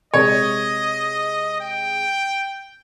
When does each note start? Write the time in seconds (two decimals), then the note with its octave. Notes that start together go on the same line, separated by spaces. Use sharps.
0.14 C3 G#3 C#5 D#5
1.61 G5